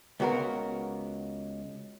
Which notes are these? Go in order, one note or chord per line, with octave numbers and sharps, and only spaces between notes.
C#2 B3 F#4 A#4